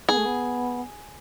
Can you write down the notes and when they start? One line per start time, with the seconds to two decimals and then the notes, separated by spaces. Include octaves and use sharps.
0.09 B3 G#4
0.16 A3
0.25 B3